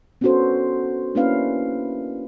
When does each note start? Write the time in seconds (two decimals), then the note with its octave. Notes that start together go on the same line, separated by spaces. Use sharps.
0.21 B3 C#4 D4 F#4 A4 C5
1.15 A#3 C#4 D4 E4 B4 F5